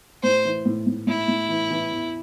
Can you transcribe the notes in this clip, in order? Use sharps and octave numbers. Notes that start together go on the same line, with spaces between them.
A2 C5
E3
A2
A2
A2 E4
A2
E3
E3
E2